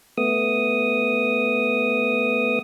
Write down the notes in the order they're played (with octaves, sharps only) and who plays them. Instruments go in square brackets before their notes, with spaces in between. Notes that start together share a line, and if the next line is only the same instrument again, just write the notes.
[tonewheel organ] A3 B3 D#6